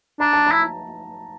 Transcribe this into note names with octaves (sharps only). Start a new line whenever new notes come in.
D4 A#5
A5
E4 A#5